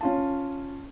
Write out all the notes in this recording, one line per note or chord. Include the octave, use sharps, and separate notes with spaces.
C#4 F4 A5